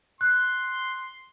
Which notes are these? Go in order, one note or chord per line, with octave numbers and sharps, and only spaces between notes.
C6 F#6